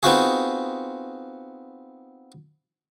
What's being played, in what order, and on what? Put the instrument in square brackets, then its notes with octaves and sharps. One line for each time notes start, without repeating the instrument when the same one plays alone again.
[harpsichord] B3 C4 D#4 F4 F#4 G#4